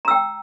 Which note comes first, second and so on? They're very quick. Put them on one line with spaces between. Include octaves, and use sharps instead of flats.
A#5 E6 G5